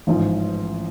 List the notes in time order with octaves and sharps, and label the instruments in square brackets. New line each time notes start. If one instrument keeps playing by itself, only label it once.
[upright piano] A1 G#2 F3